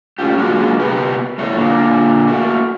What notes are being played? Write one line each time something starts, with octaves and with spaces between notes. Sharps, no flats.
A3 C#4 F4 G4
F#3 G#3 A#3 D4 F4 F#4
C3 B3 G4 A#4 B4
E2 A3 C#5
A#2 D3 A#3
A3 A#3 F#4